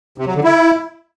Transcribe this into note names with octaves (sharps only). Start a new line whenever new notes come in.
C3
F#3
D3
E4